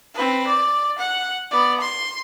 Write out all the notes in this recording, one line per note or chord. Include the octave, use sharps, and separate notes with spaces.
C4 B4
D5
F#5
B3 D5
C6